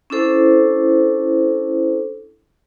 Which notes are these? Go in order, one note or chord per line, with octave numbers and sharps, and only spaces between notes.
C#4 D4 E4 A4 C5